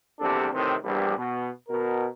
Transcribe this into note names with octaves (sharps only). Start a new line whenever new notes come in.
A#1 E2 C3 G3 D4 A4
A2 C3 D#3 E3 C4
A#1 E2 G2 G3
B2
B2 A#4